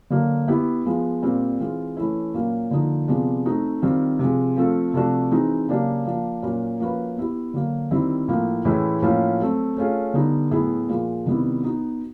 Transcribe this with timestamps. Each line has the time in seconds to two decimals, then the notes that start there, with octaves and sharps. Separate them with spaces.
0.10 D3 F#3 A#3
0.48 B3 E4 G4
0.85 F3 G#3 B3
1.22 A#2 G3 C4
1.60 E3 G#3 C4 F4
1.97 E3 A3 C#4 E4
2.34 A#2 F#3 A#3 C#4
2.71 D3 F3 A#3 D#4
3.08 C3 F3 G#3 B3 D4
3.46 A3 C4 D#4 F#4
3.82 D#3 G3 C4 F4
4.19 C3 F3 G#3
4.56 F3 A3 C4 F4 A4
4.94 C3 F3 A3 D4 F#4
5.31 E3 G#3 C4 D#4 F#4
5.68 C#3 F#3 A#3 D4 G4
6.05 F3 A#3 D4
6.42 A#2 F#3 A#3 C#4 F#4
6.80 F3 A#3 C#4 F#4 B4
7.17 B3 E4 G4
7.54 D3 F#3 A#3
7.91 D#3 G3 C4 E4
8.28 A2 F3 A#3
8.65 A2 E3 G#3 C#4 E4
9.02 A2 F3 A#3 C#4 F4
9.40 F#3 A3 C4
9.77 A3 C#4 F4 G#4
10.14 D3 G3 B3 D#4
10.51 A2 F#3 B3 E4 G#4
10.88 A#2 F3 G#3
11.26 C3 D#3 G3 B3 E4
11.63 B3 D#4 F#4